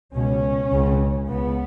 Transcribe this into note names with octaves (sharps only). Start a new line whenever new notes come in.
C#2 B2 C#4
C#2 C#3
C#2 C#3 B3